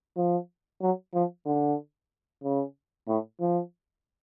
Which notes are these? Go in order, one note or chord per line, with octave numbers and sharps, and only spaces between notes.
F3
F#3
F3
D3
C#3
A2
F3